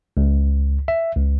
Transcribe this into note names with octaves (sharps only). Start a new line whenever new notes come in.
C#2
E5
C#2